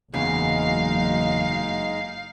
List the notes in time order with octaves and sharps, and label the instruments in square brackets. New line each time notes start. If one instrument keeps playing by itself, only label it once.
[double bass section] F#1 F#3 [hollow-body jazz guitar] E2 C#3 [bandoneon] G#3 D#4 [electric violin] F5